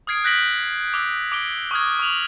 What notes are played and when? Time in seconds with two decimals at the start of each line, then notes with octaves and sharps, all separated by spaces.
0.07 D#6 F6 G#6 C7 D7
0.24 F#6 G6 A#6 B6 D7 F#7
0.94 D6 E6
1.32 D6 D7 G7
1.71 C#6 D#6 F6 G#6
1.99 C#6 F6 F7 F#7